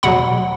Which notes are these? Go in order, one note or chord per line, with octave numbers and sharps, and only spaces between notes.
E2 B2 F#3 F#5 B5